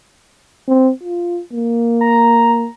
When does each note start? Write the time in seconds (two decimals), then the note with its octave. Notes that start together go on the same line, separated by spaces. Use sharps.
0.68 C4
1.03 F4
1.53 A#3
2.01 A#5